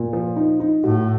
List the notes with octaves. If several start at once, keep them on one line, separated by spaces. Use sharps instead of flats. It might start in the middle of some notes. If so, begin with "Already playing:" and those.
Already playing: A#2
F3
D#4
D#4
A2 F#4